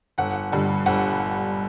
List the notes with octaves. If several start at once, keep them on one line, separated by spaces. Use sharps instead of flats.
G1 F#5
G2 D3
G1 F#5